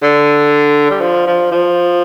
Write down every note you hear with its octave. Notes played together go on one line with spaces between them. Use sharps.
D3
G3
F3
F3
F3